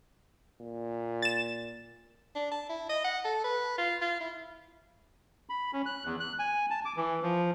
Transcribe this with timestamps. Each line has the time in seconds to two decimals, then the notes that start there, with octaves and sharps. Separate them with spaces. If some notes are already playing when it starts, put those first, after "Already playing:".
0.60 A#2
1.22 A6 E7
2.35 D4
2.52 A5
2.69 E4
2.90 D#5
3.05 F#5
3.25 A4
3.44 B4
3.78 F4
4.01 F4
4.20 E4
5.49 B5
5.73 C#4
5.86 F#6
6.05 E2
6.20 F#6
6.39 G#5
6.70 A5
6.85 D6
6.97 E3
7.22 F3